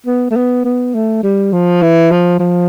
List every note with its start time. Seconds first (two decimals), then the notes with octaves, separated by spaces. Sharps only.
0.06 B3
0.31 A3
0.36 B3
0.65 B3
0.94 A3
1.23 G3
1.52 F3
1.82 E3
2.11 F3
2.39 F3